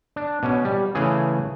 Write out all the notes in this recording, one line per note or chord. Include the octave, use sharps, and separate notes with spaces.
D4
B2 C#4
G3
C#3 E3 A3 G#4